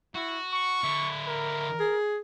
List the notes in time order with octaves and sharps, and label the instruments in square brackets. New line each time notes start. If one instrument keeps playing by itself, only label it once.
[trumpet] E4 [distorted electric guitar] F#4
[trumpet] C#6
[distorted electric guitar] D3 E4
[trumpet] A#4
[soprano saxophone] G#4